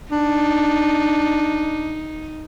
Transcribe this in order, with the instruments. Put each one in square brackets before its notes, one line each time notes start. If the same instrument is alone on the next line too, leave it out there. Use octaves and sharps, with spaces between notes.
[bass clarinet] D4 [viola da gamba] D#4